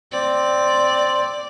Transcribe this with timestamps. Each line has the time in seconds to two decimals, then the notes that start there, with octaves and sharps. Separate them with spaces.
0.12 C4 D5